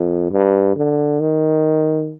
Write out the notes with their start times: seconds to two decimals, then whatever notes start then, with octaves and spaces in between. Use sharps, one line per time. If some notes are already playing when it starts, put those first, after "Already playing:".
Already playing: F2
0.31 G2
0.76 D3
1.20 D#3